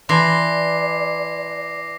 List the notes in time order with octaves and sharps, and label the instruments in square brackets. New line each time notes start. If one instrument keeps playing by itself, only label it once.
[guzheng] E3 [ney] D5 [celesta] A5 B5 C6 [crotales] D6 A#6 C7